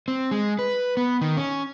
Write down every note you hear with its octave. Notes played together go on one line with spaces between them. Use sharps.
C4
G#3
B4
B3
D#3
C#4